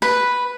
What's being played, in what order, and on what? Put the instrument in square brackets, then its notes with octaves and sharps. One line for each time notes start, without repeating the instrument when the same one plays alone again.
[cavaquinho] B4